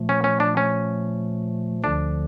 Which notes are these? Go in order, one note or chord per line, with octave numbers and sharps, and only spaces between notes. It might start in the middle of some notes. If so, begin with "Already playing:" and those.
Already playing: A#2 F3 A3
C#4
C#4
D4
C#4
D2 D3 F3 D4